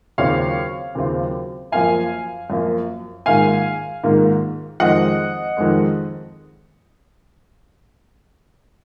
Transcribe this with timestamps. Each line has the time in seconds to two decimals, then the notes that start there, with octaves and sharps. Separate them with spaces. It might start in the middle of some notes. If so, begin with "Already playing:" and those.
0.18 D#2 C#3 F#3 C4 F4 C#5 F5
0.95 D#2 C#3 F#3 C4 F4
1.72 F#2 F3 A#3 F4 F5 G#5
2.50 F#2 F3 A#3 F4
3.26 G#2 D#3 A#3 F4 F5 G#5
4.04 G#2 D#3 A#3 F4
4.80 F2 D#3 G#3 C4 D#5 F#5
5.57 F2 D#3 G#3 C4